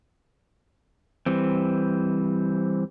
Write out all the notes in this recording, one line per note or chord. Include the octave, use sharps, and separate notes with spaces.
E3 G3 C4